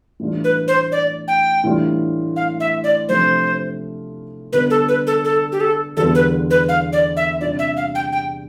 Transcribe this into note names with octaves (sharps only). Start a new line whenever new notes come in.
A2 E3 G3 D4 F4
B4
C5
D5
G5
A2 E3 G3 D4 F4
F5
E5
D5
C3 F3 A3 D4 F4 C5
D3 G3 B3 B4
A4
B4
A4
A4
G4
A4
E2 D3 G3 B3 F4 A4
B4
B4
F5
D5
E5
C3 G3 D4 F4 D5
E5
F5
G5
G5